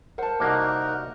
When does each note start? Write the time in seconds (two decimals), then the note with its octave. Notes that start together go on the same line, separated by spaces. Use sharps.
0.18 A#4 C5 F#5 A5
0.40 C2 A#3 D#4 F#4 A#4 D6